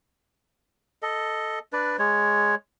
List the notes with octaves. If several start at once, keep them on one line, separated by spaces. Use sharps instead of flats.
A4 D#5
D4 B4 D5
G#3 C#5